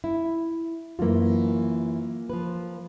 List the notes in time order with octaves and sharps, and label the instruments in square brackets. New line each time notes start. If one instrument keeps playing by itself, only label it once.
[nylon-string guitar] E4
[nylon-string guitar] F#2 E3 [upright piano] A#3 F4
[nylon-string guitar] F3 B4